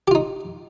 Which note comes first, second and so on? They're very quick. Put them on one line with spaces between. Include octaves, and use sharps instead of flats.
G4 F4 D#4